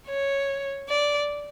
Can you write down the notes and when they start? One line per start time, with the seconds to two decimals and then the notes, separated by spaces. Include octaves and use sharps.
0.08 C#5
0.89 D5